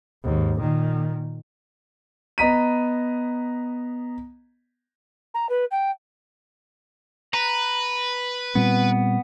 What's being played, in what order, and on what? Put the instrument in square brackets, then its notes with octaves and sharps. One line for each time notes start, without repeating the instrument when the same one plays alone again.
[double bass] D#2 G#2
A#2 D#3
[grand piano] B3 D#5 A#5 B6 D#7
[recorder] A#5
B4
G5
[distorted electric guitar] B4 [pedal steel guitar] A#5
[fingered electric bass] A#2 G3 C4 [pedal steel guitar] B3